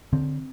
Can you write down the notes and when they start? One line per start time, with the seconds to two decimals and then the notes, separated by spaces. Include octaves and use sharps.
0.13 D3 C4